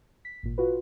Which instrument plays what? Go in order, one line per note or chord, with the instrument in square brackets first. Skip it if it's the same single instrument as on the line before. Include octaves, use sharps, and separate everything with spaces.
[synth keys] B6
G#1 A#2
F4 F#4 B4